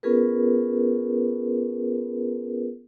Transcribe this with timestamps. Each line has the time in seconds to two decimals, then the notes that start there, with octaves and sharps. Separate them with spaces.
0.03 B3 C#4 F4 G#4 A#4 B4